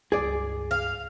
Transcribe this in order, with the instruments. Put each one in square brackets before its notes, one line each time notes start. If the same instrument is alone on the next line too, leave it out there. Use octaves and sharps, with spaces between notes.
[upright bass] C#2 G2 [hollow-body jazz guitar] G#4 D5
[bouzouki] F5